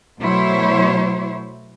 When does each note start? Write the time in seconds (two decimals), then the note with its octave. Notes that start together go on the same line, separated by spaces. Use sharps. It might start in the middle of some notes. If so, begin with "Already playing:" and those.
0.20 B2 F#3 A3 E4 C5 C#5